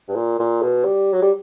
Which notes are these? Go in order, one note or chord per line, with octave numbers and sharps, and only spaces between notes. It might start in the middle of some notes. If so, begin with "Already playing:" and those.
G2
A#2
A#2
B2
G3
F#3
G3